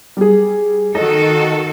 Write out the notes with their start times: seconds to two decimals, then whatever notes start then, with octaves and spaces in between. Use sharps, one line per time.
0.17 G3 G#4
0.95 D#3 F#4 A4 D#5